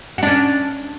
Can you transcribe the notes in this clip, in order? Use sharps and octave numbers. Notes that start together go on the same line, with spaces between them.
C#4 D4 F#4